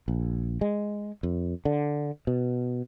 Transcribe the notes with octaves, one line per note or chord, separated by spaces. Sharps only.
A#1
G#3
F2
D3
B2